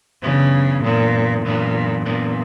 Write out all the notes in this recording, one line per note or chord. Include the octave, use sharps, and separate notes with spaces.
F#2 C#3 E3 B3 D4
F#2 A#2 E3 B3 D4
F#2 A#2 E3 B3 D4
F#2 A#2 E3 B3 D4